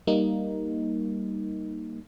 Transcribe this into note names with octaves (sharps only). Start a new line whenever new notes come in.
G3 A#3 D#4